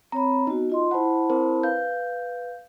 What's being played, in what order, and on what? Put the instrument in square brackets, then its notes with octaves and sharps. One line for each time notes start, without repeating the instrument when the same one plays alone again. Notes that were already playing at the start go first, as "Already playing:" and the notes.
[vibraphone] C4 C#5 B5 [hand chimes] A#5
[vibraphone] B3 F#4 [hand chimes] D#4
[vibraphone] F4 D#5 C6
[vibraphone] E4 A5 B5 [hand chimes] C5 F#5
[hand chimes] C4 A#4 C5
[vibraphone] B4 [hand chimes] F5 G6